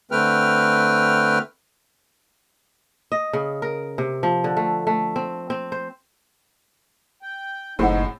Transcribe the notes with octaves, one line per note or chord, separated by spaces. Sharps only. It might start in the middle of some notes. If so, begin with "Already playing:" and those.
D3 A3 C4 B4 G5 F6
D#5
C#3
A#4
C3
F3
D3
A3
A3
C4
C4
C5
G5
F#1 A2 G#3 C4 D#4 A4 E5 F#5